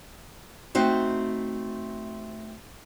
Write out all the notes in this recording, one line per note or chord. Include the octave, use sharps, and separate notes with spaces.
A3 C4 D#4 F#4